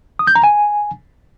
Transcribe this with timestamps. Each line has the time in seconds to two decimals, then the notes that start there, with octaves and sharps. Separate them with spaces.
0.19 D#6
0.27 G6
0.35 A#5
0.44 G#5